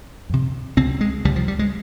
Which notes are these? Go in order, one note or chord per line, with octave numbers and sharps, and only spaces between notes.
F2 C3
C#2 C3 C4
G#3
C#2 C3 G3
F3
G3
G#3